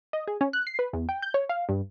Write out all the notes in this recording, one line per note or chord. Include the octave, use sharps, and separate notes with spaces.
D#5
G#4
C#4
F#6
C7
B4
E2
G5
G6
C#5
F5
G2